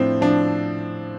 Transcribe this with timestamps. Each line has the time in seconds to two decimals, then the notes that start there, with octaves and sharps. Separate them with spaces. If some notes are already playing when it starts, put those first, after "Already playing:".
Already playing: A2 F3 C4 D4
0.21 F3 D4